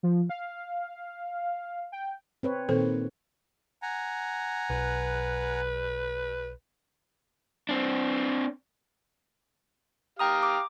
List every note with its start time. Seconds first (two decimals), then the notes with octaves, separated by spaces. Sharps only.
0.03 F3
0.30 F5
1.92 G5
2.43 C4 B4 C#5
2.69 A#2 D#3 A#3 C4 A4 C5
3.82 F#5 G#5 A#5
4.70 B1 B4
7.69 C4 D4
10.19 G4 F5 G5 A#5 D#6
10.43 D6